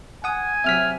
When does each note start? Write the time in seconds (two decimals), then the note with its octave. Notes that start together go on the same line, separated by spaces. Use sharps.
0.24 F#5 G#5 D#6
0.64 C3 F#3 E5 F6 B6